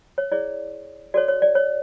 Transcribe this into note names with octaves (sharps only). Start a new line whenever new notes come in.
C#5
E4 G#4 C#5 D5
F#4 A4 C#5 D5
C#5
D5
C#5